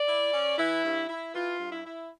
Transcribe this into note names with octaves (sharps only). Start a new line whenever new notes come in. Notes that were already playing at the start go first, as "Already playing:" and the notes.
Already playing: D5
E4
C#4
E3 E4
G2
E4
E3 F4
G2
E4
E4